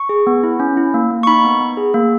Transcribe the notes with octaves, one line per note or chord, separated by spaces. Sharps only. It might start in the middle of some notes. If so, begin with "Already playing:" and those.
Already playing: C#6
G#4
B3
E4
C#4
E4
A#3
A#3
C#6
D#4 B5
B3
B3
G#4
A#3